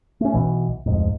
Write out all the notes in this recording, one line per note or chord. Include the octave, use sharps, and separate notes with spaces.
A3 C#4
B1 B2 E3
D1 F2 G#2